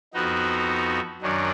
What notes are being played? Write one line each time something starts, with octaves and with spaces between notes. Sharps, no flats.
F2 F3 B3 D#4 F#4
F#2 D#3 F#3 D4